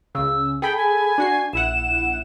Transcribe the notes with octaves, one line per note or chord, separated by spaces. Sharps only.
C#2 C#3 E6
G#4 A4 G5 B5
G#5
D4 F#4 C7
A#1 E4 F#5 E7